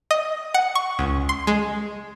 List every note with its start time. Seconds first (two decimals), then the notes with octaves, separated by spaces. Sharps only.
0.11 D#5
0.54 F#5
0.75 C#6
0.99 C#2
1.29 C6
1.47 G#3